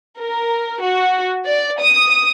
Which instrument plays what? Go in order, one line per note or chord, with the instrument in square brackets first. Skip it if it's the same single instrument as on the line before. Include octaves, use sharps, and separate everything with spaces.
[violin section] A#4
F#4
D5
D#6